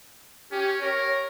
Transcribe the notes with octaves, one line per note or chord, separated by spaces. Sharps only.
C#4 G4
A#4 C#5